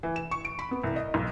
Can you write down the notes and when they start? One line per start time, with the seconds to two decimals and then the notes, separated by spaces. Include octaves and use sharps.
0.03 E3
0.16 E7
0.31 C#6
0.45 D7
0.59 B5
0.71 B3
0.84 C2
0.96 D#5
1.14 B1